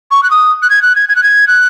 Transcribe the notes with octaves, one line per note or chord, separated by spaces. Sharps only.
C#6
F#6
D#6
F#6
G#6
F#6
G#6
G#6
F#6
G#6
F#6